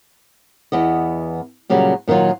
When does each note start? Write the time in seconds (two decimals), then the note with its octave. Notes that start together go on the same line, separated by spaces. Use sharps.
0.72 E2 B3 D#5
1.70 A#2 C#3 F#3 G3
2.08 A#2 D#3 E3 F#3 F4